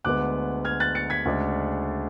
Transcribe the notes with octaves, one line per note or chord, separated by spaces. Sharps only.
D2 D3 G#3 B3 D6 F#6
F6 G#6
F#6 A6
A6 C#7
G#6 B6
D2 C#3 G#3 D4